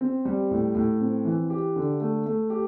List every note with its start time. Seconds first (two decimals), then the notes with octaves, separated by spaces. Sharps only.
0.01 C4
0.25 G3
0.51 A2
0.75 A2
1.01 C4
1.25 E3
1.50 G4
1.76 D3
2.01 A3
2.26 A3
2.50 G4